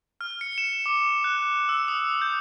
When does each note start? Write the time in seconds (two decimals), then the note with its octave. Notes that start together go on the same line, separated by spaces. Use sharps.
0.21 F6
0.41 C#7
0.58 E7
0.86 D6
1.24 F#6
1.69 E6
1.88 D#6
2.22 G6